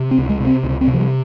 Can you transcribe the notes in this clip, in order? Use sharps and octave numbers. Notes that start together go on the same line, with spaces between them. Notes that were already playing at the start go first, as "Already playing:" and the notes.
Already playing: C3
C4
C#2
G#3
C3
C4
C#2
C4
C3
F3
G3